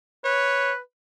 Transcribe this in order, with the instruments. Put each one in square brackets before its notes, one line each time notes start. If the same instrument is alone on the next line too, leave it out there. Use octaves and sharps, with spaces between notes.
[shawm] B4 [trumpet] C#5